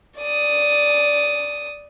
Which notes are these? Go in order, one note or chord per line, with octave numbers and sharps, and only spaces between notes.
D5 D#6